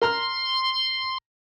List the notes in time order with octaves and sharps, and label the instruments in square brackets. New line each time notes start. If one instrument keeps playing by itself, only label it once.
[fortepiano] A#4 A#5 F6 [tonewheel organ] C6